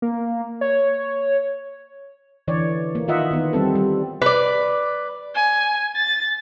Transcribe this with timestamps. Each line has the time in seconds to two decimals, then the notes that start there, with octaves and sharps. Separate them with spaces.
0.02 A#3
0.61 C#5
2.48 D3 E3 C#5 D5
2.95 A#3
3.08 D#3 F4 D#5 E5 F#5
3.31 D#3 B3
3.53 G3 C4 A4
3.75 G3
4.22 B4 D5
5.35 G#5
5.96 A6